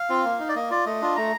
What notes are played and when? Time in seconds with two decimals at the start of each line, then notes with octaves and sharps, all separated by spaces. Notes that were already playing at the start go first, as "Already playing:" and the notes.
Already playing: F5
0.10 C4 F4
0.24 A#3
0.39 D#4
0.49 D5
0.55 A#3 D#5
0.70 F4 D5
0.86 A3 D#5
1.01 D4 F4
1.16 A3 A#5